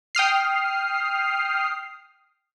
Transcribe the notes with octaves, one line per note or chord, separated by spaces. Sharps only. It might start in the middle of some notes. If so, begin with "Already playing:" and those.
G5 D#6 F6 C7